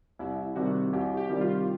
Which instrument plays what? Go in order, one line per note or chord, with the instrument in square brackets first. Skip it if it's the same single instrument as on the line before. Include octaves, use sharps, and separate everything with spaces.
[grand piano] C2 [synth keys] E4
[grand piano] C3 D#3 G3 [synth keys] F#4
[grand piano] C2 [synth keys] G4
[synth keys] G4
[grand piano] C3 D#3 G3
[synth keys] F4